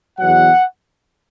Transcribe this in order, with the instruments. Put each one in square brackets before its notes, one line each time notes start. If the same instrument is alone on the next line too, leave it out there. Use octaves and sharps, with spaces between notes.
[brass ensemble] E2 B2 F#3 F#5